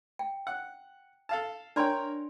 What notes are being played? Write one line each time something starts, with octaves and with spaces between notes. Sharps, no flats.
G5
F#5
A4 F5 A5
D4 A#4 C#5 D5 G5 C6